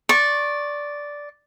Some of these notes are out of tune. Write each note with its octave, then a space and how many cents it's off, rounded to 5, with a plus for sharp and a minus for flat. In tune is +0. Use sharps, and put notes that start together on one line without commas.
D5 -5 C#6 -25